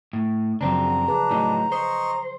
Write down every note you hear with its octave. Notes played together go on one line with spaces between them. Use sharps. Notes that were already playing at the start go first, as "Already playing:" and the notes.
A2
F#2 C#3 F3 F#3 C4 D4 A#5
D4 G#4 B4
A2 F#3 D#4
C5 D#5 C6 C#6